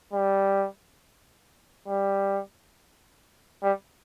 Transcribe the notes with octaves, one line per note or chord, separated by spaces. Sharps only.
G3
G3
G3